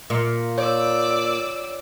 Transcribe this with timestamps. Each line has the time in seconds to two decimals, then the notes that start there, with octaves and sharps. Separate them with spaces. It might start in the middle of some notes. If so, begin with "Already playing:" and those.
0.10 A#2
0.58 C#5 D5 E6